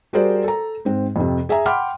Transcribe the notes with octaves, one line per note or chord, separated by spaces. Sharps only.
G3 F#4 G#4 A#4 C5 D5
A4 A#5
G#2 C4
F2 C3
G#4 E5 G#5 A#5
F#5 G5 B5 C6 D6 F6